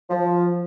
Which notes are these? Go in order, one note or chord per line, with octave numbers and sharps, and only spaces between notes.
F3